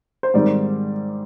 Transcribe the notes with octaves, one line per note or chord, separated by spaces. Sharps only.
C5
G#2 D#3 G3 C4 D5